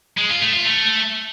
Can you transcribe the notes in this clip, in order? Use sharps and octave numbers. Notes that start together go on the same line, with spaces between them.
G#3
F4
A3
F4
A3